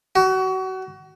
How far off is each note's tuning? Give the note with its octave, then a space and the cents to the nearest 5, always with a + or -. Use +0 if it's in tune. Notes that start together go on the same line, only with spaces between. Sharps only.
F#4 +30